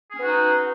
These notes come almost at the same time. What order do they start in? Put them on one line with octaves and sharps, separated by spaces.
G#4 C#4 B3 F#4 D#4